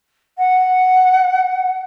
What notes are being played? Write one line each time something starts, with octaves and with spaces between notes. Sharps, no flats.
F#5